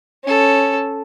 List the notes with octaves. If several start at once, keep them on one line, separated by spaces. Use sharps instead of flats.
C#4 A4